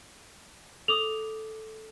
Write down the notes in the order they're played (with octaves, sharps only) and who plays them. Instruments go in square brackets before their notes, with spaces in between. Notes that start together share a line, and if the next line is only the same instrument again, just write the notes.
[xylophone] A4 D6 D#6 [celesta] F7